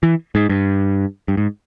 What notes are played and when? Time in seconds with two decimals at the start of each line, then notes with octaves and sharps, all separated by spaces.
0.03 E3
0.35 G#2
0.50 G2
1.28 G2
1.37 G#2